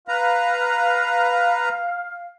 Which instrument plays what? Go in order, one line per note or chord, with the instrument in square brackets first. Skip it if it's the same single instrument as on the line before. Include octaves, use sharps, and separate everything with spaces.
[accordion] B4 A#5 [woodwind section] F5